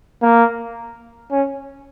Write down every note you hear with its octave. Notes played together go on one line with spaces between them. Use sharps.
A#3
C#4